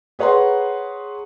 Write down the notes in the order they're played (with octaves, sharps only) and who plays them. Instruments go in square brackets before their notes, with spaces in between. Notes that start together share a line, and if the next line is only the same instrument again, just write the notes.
[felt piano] G#4 B4 C#5 F#5 A#5 C6